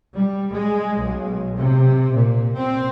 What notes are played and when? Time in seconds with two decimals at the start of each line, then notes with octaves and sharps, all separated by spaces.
0.16 G3
0.52 G#3
1.00 B1
1.57 C3
2.15 A#2
2.54 C4